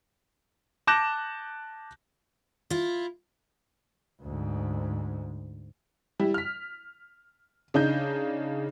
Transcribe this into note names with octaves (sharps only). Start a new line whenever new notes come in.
A5 D6 F#6 G6 A#6 E7
E4 F4
D2 G#2
G3 E4
F6 B6
C#3 D4 D#4 G6